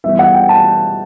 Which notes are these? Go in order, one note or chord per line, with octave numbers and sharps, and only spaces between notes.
E3 G3 B3 E5
F#5
G5
A5